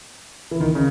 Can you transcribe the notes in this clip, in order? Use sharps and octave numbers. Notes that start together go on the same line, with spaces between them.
E3
D#3
C#3